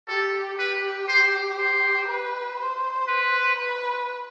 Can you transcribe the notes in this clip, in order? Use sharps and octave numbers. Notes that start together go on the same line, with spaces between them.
G4 A4
G4 B4
C5
C5
B4
C5
B4
B4